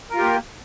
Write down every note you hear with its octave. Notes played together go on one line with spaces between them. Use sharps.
A#3 F4 G4 A#4